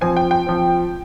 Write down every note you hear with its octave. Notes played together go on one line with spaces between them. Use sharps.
F3 C4 G#5
G5
G5
F3 C4